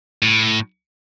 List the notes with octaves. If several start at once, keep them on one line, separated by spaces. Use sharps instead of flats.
A2